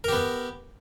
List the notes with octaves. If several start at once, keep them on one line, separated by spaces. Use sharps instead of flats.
B3 G4 A#4